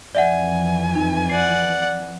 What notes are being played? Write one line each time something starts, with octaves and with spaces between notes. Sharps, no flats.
F2 E3 D5 E5 F#5 G#5
D#4
D5 F#5 C7